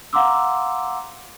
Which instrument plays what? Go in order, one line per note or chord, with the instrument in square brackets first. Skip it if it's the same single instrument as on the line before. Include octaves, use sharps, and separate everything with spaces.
[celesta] F5 F#5 A#5 C6 D6 E6